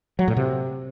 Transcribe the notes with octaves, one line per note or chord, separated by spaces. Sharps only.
F#3
A2
C3